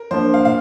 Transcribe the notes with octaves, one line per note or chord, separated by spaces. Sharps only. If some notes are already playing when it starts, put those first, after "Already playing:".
Already playing: A#4
F3 A#3 D4 C5
F5
A#2 F5